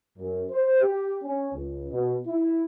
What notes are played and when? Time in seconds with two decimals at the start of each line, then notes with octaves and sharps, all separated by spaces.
0.18 F#2
0.51 C5
0.81 G4
1.23 C#4
1.54 C#2
1.91 B2
2.27 E4